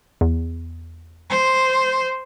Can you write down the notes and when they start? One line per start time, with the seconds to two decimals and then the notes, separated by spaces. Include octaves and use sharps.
0.21 E2
1.30 C5